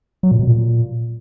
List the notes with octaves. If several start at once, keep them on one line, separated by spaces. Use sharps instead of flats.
F#3
A#2
B2
A#2